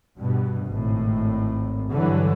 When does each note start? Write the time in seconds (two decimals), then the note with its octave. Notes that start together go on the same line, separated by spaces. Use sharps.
0.18 G2 B2
0.68 G#1 A2
1.91 G2 D3 E3 F#3